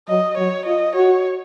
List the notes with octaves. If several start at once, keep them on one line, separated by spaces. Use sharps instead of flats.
F#3 D#5
F#3 C#5
F4 D#5
F#4 C#5